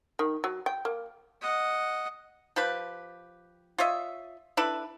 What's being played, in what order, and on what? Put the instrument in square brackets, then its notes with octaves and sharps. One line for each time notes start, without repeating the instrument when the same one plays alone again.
[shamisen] D#3
F#3
G5
A#3
[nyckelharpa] D#5 F#5
[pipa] F3 G4 B4
F4 C#5 D#5 E5
D4 E4 A4 B4